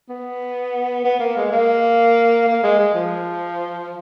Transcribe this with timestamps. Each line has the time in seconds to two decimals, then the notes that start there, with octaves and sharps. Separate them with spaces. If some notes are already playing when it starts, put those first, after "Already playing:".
0.09 B3
1.04 B3
1.20 A#3
1.37 G#3
1.52 A#3
2.48 A#3
2.63 G#3
2.79 G#3
2.95 F3